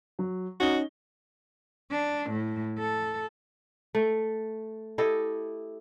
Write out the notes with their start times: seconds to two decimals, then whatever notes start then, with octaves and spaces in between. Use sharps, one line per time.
0.19 F#3
0.60 C#4 D#4 F#4 G7
1.91 D4
2.30 A2
2.79 A4
3.95 A3
4.98 E4 G4 A4 D#5